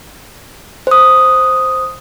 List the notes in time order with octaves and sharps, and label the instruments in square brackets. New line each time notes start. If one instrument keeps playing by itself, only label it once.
[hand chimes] C5 D#6